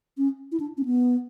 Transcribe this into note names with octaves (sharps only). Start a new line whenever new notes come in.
C#4
E4
D4
C#4
B3